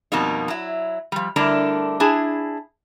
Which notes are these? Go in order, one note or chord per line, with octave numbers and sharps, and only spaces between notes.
F2 B2 G3 A#3 D#4
F#3 E4
F3 G3
D3 G3 A3 D4 E4 A#4
D4 E4 G#4